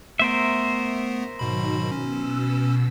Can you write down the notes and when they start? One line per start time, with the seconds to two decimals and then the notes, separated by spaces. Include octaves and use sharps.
0.19 A3 B3 A#4 C5 E5
1.39 G#2 B2 D#3 F#3 B5
1.91 B2 C#4 E6